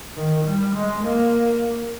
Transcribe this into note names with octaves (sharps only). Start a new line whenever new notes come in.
D#3
G3
G#3
A#3